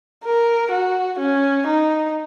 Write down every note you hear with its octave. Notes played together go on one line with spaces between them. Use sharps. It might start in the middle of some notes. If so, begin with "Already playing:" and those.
A#4
F#4
C#4
D#4